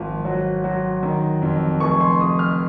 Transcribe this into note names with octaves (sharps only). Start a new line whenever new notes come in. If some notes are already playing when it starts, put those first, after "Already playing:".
Already playing: G#1 F3
F#3
F#3
D#3
F2
F1 C#6
C6
F1 D#6
F6